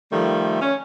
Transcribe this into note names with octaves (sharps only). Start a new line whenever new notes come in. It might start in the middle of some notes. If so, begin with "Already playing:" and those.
D#3 F3 G3 A3
C#4